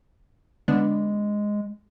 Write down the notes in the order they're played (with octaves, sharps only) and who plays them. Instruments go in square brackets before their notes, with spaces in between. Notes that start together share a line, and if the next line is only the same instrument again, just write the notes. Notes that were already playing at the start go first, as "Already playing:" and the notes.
[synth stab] D3 B3 D4 [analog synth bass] G#3